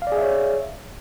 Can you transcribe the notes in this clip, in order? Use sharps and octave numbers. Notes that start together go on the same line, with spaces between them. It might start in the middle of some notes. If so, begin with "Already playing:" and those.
G#4 C#5 D5 E5 F5